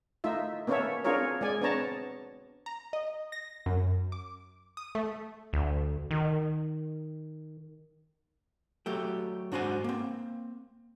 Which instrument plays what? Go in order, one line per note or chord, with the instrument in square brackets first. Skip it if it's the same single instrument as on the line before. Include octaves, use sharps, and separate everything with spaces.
[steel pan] A3 D#4 F4 E5
A#3 B3 C#4 A4 C#5 E5
C4 D4 F4 G#4 A#4 C#5
G#3 D5 G#5
B3 C4 D4 C#5 A5 A#5
[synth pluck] A#5
D#5
A#6
F#2
D6
D#6
A3
[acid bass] D2
D#3
[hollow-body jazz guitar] F#3 A3 G4
G#2 D4 F#4 C5 F#5 G#5
A#3 C4